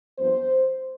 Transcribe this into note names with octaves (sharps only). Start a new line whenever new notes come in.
G2 F3 B3 C5